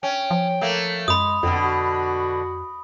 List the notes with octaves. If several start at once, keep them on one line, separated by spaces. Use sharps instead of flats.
C#4 G5
F3
A3 A#3
F#2 G#3 B5 D#6
F2 B2 D3 C4
F#4